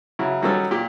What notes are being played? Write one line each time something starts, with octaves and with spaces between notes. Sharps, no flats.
C#3 F#3 E4
D#3 F#3 G3 C#4 A4
A#2 G4